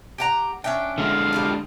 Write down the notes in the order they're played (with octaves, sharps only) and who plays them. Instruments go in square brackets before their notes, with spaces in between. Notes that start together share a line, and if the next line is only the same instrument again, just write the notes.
[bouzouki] G4 F#5 A#5
[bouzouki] C#4 E5 G5 [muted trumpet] D4
[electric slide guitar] D3 G#3 [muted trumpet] F5
[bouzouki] G3 D4 F4